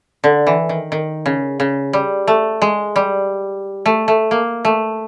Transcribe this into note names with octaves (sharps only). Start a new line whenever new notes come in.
D3
E3
D#3
D#3
C#3
C#3
G3
A3
G#3
G3
A3
A3
A#3
A3